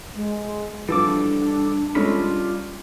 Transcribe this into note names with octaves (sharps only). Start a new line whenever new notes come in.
G#3
E3 F3 G3 D4 A4 D6
G3 G#3 C#4 F4 A4 B5